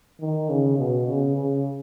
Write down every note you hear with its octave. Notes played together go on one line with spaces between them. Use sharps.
D#3
C#3
B2
C#3
C#3